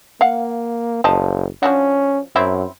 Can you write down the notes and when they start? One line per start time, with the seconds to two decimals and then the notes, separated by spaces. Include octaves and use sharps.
0.21 A#3 F5 F#5
1.04 F#1 F3 D#5 A5
1.63 F3 C#4 D4 F#4
2.36 F#2 F#3 C4 E4